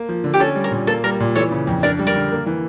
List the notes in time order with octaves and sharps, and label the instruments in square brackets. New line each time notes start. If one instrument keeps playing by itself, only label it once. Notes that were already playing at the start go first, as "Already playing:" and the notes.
Already playing: [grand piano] A#3
F3
D3
[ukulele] G4
[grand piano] C#4 [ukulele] A4
[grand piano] G3
[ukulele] A#4
[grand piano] A#2
[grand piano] A#3 [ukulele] A4
[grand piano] G3 [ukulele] A#4
[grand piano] A#2
[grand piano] E3 [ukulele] A4 C#5
[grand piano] C#3
F2
[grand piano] D4 [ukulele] A#4 D5
[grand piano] G3
[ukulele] A#4 D5
[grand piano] D3
A#3
E3